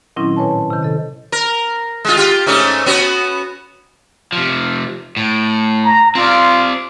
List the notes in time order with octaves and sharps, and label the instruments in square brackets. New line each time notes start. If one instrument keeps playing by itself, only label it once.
[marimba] A#2 D#3 F#3 C4 C#4 E4
A2 B4 C#5 G#5 A5
C3 D#3
A4 D#5
[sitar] A#4
G#3 F4
F4 G4
G#2 A3 C#4
B3 C#4 F#4
[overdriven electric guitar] C3 F3
A2
[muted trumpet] A#5
[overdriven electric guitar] C4 D5 [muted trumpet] F4